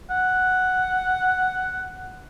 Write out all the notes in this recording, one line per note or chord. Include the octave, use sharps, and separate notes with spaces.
F#5